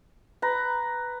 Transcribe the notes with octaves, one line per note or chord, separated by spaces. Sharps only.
B4 A#5